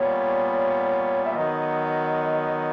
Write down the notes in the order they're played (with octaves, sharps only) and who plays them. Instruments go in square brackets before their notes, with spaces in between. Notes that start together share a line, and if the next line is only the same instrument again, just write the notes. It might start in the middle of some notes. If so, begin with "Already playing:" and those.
Already playing: [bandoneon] A#2 G3 B3 [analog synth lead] C#5
[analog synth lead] E5
[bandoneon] D#3 F#3 B3 [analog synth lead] D#5